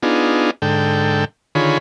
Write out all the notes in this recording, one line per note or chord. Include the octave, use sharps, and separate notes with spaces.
B3 D4 D#4 F4 G#4
G#2 D3 A4 G5
D3 D#3 F4 G#4 C#5 B5